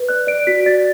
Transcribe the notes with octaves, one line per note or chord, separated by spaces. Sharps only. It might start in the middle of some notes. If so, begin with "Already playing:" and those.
Already playing: B4
D5 F#6
D5 D7
F#4 B6
D5 A6